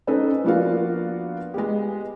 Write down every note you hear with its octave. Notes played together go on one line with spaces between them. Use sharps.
C#4 D#4 A4 B4 C5 D#5
F3 A#3 B3 D4 F#4 F5
G#3 B3 G4